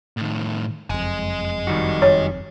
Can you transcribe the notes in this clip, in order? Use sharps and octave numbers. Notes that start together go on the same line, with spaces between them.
A2 D#3
F#1 F2 D#5 G#5
D#3 G3 F#4
C#5